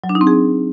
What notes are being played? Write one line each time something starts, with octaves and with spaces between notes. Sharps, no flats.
F#3
D4
D#4
C4
G#4